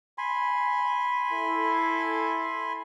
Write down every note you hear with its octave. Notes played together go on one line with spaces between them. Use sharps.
G#5 B5 C6
E4 A4